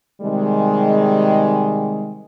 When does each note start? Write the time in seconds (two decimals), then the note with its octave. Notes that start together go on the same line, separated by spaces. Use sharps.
0.22 C3 D#3 G3 G#3